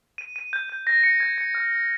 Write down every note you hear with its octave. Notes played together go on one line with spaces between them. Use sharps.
D#7
D#7
G6
G6
A#6
C#7
G#6
C#7
F6
F6